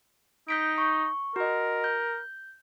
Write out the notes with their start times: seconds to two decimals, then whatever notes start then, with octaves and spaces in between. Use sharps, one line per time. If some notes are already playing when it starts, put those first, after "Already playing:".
0.48 D#4 G6 B6 D7
0.78 C#6
1.36 F#4 A#4 D#5
1.84 G6